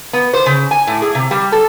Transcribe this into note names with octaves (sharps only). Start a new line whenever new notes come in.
B3
C5
C#3
G#5
A2
G#4
C3
G3
A4